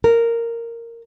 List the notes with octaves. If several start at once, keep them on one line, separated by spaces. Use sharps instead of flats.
A#4